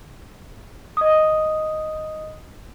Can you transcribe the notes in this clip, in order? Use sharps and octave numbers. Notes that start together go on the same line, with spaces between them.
D#5 D#6